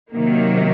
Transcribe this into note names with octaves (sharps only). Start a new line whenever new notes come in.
C3 D#3 F#3 A#3